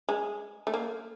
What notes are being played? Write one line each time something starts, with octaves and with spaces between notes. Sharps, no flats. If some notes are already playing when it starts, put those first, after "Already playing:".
G#3
A3
A#3